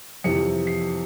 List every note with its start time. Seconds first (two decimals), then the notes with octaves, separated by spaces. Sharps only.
0.24 F2 C3 E3 C#7
0.67 C7